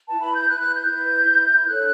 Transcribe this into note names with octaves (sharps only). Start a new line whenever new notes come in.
E4 B4 A5
B5
G6
E4 B4 F#6
F#6
G6
E4 B4
E4 B4
G6
D4 A4 C#5 F#6